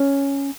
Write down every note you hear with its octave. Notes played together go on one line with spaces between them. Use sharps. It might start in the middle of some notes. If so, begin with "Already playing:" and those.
Already playing: C#4